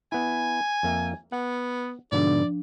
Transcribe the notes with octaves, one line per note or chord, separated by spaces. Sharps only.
B3 E4 G#5
F2 A#3 E5
B3 F#5
G#2 B2 D3 F3 D4 D5